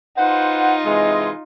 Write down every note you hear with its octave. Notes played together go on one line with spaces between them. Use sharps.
D#4 F4 B4 C5 F#5
C3 E3 G#3